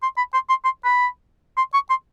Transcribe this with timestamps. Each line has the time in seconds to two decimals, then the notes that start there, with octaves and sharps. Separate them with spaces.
0.03 C6
0.18 B5
0.34 C6
0.49 C6
0.65 C6
0.85 B5
1.57 C6
1.74 C#6
1.90 C6